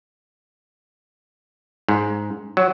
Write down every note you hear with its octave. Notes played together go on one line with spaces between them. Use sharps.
G#2
F#3